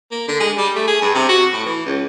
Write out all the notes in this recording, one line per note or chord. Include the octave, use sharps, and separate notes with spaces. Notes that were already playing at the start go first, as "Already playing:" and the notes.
A#3
D3
G#3
G3
A3
G#4
G2
C3
F#4
A2
E3
C#2